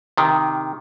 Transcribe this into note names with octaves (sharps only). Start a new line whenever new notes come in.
C3 D#3